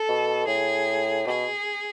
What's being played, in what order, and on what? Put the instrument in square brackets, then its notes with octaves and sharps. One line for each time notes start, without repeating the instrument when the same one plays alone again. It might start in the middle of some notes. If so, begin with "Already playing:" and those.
Already playing: [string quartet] A4
[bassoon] B2
[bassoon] A2 [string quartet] G#4
[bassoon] B2 [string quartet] G#4